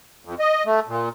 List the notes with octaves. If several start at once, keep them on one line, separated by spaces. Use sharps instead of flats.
F2
D#5
A3
A#2